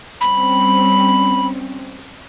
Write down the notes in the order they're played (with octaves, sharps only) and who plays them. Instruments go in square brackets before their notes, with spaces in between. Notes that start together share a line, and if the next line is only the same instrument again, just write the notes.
[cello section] G3 C4 C#4 [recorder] B5